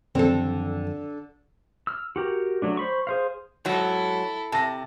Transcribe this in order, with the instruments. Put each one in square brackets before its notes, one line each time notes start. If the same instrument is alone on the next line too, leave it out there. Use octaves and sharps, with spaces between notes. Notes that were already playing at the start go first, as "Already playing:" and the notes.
[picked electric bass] F#2 D#3 F3 [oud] D3 A4 [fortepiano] C4
[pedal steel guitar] E6 F6
F#4 G4 A#4
F#3 A3 D4
C5 B5 C#6
G#4 C5 F5
[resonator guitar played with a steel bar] G#2 F#3 [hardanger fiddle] E4 A4
[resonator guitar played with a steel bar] C3 [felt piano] A5 A#6